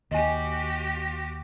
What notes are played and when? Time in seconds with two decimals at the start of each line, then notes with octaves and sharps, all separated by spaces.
0.11 D#2 F#4 G4 D#5 G#5